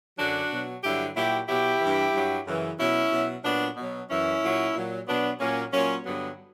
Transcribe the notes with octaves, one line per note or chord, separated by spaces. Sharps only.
F#2 D3 F#3 D4 F#4
B2 F#3
G2 D3 F#3 E4 G4
A#2 F#3 E4 G4
B2 F#3 E4 G4
G2 E3
G2 F#3
F#2 C#3 E3
B2 F#3 C#4 E4
B2 F#3
A#2 F#3 B3 D4
B2 F#3
F#2 E3 C#4 E4
A#2 F#3
A#2 F#3
B2 F#3 B3 D4
A#2 F#3 A#3 C#4
A#2 F#3 A#3 C#4
G2 D3 F#3 B3